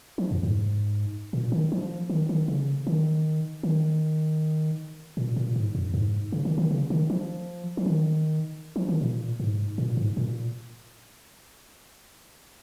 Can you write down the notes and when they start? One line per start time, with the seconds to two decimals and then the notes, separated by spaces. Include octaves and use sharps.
0.18 F3
0.31 F2
0.43 G#2
1.33 A#2
1.52 D#3
1.72 F3
2.10 D#3
2.29 D#3
2.48 C#3
2.87 D#3
3.63 D#3
5.17 A#2
5.36 A#2
5.56 G#2
5.75 F2
5.94 G#2
6.32 C#3
6.45 D#3
6.58 D#3
6.71 C#3
6.90 D#3
7.10 F3
7.77 F3
7.86 D#3
8.76 F3
8.89 D#3
9.01 A#2
9.40 G#2
9.78 A#2
9.97 G#2
10.17 A#2